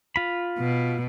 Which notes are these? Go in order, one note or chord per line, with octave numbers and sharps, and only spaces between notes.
F4 B5
B2